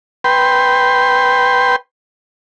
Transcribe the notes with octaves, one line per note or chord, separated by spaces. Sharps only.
B4 G5 C6